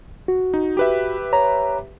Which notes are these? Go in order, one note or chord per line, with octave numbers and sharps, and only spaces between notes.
F#4
D#4
G4 B4 E5
C#5 A#5